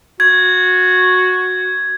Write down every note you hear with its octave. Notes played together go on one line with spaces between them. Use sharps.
F#4 G#6